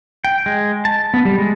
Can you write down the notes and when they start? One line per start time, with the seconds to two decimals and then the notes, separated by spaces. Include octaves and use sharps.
0.24 G5
0.46 G#3
0.85 A5
1.14 B3
1.25 G3
1.38 G#3